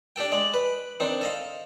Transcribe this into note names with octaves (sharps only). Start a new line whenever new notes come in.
D4 G4 A4 G5
G#3 D5
B4
D#3 C4 D4
A4 D#5 F5